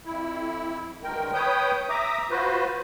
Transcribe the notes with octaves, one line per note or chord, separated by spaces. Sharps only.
F2 E4
D2 G2 D#3 G#3 A#4 G5
B4 C#5 G5 D#6 G6
E5 A#5 D6 D#6
F4 F#4 B4 C5